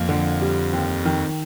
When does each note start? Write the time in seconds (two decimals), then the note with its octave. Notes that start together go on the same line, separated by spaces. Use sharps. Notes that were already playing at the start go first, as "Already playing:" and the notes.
Already playing: F2 A#3
0.09 D3
0.42 G3
0.73 D#2
1.05 D#3